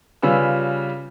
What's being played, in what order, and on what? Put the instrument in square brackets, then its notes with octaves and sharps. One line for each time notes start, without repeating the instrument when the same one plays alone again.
[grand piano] C#3 G3 F4 B4 G#5 E6